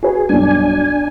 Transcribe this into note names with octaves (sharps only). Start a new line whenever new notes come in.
F#4 G#4 B4 G#5
B1 G2 D4 G#5